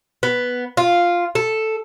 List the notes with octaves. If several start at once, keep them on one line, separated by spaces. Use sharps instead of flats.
B3
F4
A4